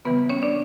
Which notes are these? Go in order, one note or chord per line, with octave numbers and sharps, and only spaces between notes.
C#3 E3 G3 B3 B4
C#4 C#5
D4 D5